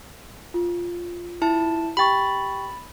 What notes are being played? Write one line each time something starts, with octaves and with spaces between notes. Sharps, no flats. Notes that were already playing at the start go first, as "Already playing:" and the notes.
F4
E4 A5
G4 G5 B5 C#6 A6